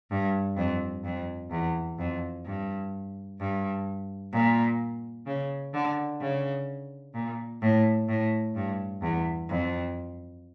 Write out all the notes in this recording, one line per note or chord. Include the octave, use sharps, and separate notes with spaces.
G2
F2
F2
E2
F2
G2
G2
A#2
C#3
D3
C#3
A#2
A2
A2
G2
E2
F2